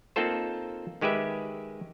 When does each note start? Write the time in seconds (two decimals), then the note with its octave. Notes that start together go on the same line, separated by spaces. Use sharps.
0.16 A#3 C4 D#4 F4 A4 C5
1.01 D#3 G#3 G4 B4 E5